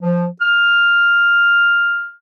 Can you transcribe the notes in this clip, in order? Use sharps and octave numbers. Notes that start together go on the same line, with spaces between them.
F3
F6